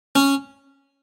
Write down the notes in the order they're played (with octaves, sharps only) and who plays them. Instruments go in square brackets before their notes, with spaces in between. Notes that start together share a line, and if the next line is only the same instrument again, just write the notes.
[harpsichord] C#4